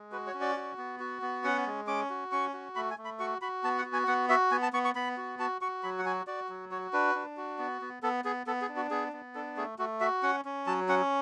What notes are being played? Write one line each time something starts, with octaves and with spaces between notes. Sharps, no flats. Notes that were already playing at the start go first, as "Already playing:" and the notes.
Already playing: G#3
F#4 B4
C#5
C#4
D5
F#4
B3
F#4
B3
C#4 F#5
G#3
C#4 D6
F#4
C#4 C#6
F#4
A3 B5
G#5
A3
B5
F#4 C#6
F#4 B5
B3 A5
F#5
F#4
G#5
B3 F#5
F#4 E5
B3 G#5
A5
B3 C#6
C#6
B3 B5
F#4
F#4 A5
F#4 C#6
F#3 B5
F#5
F#4 G#5
F#4 D5
F#3
F#4 C#5
D4 B4
D4
F#4
B3
B3
B3 A4
B3 G#4
B3 A4
G#4
D4
F#4
B3 G#4
B3
D4 A4
A3 G#4
A3 F#4
F#4 E5
C#4 F#5
C#4
F#3 A5
C#4 F#5